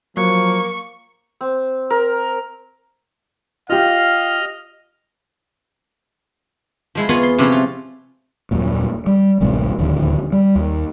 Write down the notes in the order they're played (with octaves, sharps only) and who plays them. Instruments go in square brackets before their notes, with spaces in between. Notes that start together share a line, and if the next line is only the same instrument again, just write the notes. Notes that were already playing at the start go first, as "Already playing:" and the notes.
[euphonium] F3 [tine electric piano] F#3 [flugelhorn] A#3 [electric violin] C#6
[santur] C4
A#4
[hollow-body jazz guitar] F4 G4 [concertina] D#5 F6 [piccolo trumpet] F5
[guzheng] F3 G#3 E4
E2 B3 F4 G#4 C#5 B5
C6
C3 F3 C#4 E4 F#4
F4
[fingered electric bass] D#1 F#2 A#2
G3
D1 A1 C3 G#3
D1 D#2 D3 F3
G3
D#2